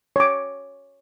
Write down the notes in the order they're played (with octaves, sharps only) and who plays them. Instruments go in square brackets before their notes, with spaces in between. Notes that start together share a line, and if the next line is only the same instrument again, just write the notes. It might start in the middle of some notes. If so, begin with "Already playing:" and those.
[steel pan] C#5 D6